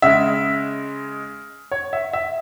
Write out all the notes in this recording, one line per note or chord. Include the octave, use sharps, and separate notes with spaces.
C#3 G#3 E5
C#5
E5
E5